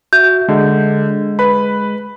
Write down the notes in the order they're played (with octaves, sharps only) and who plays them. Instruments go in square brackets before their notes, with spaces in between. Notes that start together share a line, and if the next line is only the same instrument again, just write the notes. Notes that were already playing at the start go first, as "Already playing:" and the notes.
[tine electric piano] F#4 E5 [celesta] G6
[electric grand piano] D3 [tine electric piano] G#3
[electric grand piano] B4 B5